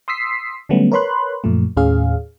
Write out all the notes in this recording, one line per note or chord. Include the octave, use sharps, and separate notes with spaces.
C6 D#6 E6 B6 C7
D3 F#3 G3 A3 B3 C#4
A#4 B4 C#5 B5 C6 F#6
F#2 A#2 F3 A3
D#2 A2 C#4 G#4 F5